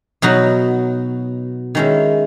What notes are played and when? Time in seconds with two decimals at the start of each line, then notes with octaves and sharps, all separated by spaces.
0.22 B2 F#3 B3 D#4 F#4
1.75 D#3 G#3 C#4 E4